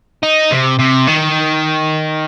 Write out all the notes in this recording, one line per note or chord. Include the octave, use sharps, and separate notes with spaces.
D#4
C3
C3
D#3